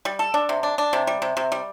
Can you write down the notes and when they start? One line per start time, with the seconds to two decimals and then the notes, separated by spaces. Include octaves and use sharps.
0.05 G3
0.19 A4
0.34 D4
0.49 C3
0.63 D4
0.78 D4
0.93 C3
1.07 G3
1.22 C3
1.37 C3
1.52 G3